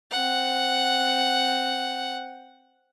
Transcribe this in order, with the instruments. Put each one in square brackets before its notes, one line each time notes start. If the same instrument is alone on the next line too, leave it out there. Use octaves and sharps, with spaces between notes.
[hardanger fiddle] C4 F#5